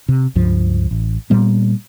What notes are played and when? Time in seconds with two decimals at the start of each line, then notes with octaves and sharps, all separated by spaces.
0.08 C3
0.35 C#2 G2 F3
0.91 A1
1.30 A#2 G3 B3